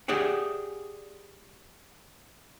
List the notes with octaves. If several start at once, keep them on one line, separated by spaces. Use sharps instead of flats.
G4 G#4 D5 E5 F#5